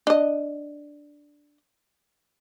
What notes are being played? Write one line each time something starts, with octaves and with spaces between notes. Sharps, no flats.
D4 D#5